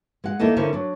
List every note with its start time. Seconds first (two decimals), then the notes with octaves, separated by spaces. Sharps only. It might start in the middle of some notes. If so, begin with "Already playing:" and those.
0.24 G#3 F#5
0.39 D#2 D#3 A#3 E4 A4 D#5
0.56 D3 C#4 E4 A4 A#4 C5
0.73 F#3 D4